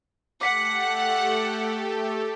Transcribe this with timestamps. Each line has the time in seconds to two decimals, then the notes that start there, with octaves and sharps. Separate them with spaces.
0.41 A3 G4 A4 F#5 D6 B6 C#7